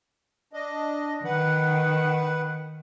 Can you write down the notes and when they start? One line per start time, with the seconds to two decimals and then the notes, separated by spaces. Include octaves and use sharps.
0.53 D4 D#5
1.25 D#3 B4 F#5